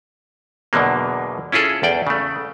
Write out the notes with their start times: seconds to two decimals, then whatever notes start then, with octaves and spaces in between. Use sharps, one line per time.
0.73 E2 B2 D3 F#3 A#3
1.52 C#4 E4 F4 G#4 A4
1.83 E2 D5 G5
2.07 C#3 A3